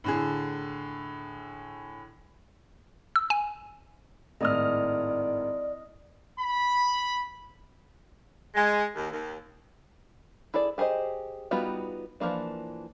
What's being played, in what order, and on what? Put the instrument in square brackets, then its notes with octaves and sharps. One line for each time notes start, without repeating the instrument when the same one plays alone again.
[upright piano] A2 D3 G#4
[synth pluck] E6
G#5
[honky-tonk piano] G#1 F6 [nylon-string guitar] A2 [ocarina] D5 [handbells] D#5 D#6
[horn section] B5
[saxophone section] G#3
D#2
D#2
[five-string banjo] E4 G#4 A4 D5
G4 G#4 A#4 C5 D#5
G3 B3 D#4 F4 F#4
E3 F3 G#3 A#3 D4